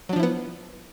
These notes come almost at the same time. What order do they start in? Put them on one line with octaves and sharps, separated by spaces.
F#3 D4 F3 E4 B3